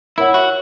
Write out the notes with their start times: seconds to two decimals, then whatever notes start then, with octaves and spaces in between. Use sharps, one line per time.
0.18 E4 A#4 C#5 F#5
0.34 F#4